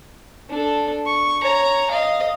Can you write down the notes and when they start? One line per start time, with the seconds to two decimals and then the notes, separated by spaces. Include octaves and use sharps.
0.50 D4 A4
1.06 C#6
1.42 C#5 A#5
1.90 D#5 F5